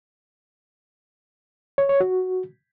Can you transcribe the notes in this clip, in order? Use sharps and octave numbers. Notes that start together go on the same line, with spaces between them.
C#5
C#5
F#4